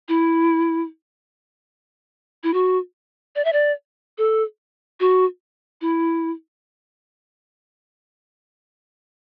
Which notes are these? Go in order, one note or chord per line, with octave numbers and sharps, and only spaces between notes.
E4
E4
F#4
D5
E5
D5
A4
F#4
E4